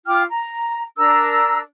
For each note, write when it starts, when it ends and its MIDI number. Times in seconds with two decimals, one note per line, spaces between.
0.06 0.23 65
0.06 0.23 79
0.06 0.23 86
0.06 0.23 89
0.29 0.84 82
0.98 1.59 62
0.98 1.59 70
0.98 1.59 82
0.98 1.59 88